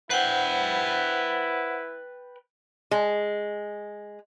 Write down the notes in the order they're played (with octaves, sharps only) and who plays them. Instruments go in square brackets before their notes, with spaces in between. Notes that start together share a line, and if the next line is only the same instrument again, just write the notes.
[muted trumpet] E4 [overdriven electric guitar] B4 G5 [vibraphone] C5 F#5
[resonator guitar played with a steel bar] G#3